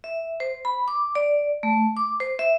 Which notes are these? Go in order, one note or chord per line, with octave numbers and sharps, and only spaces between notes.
E5
C5
B5
D6
D5
A3
D6
C5
E5